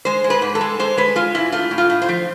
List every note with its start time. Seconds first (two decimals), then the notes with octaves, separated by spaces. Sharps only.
0.05 G#3 C5
0.24 G#3
0.30 B4
0.42 G#2
0.55 A4
0.61 G#3
0.79 G#3 C5
0.97 G#3 B4
1.16 G#3 F4
1.35 G#2 E4
1.52 A3 F4
1.71 A2
1.78 F4
1.90 A2
2.02 C5
2.09 F3